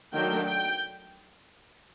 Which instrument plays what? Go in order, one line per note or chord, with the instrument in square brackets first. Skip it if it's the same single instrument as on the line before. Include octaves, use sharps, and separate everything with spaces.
[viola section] D#3 F#3 A3 D4 G5
G5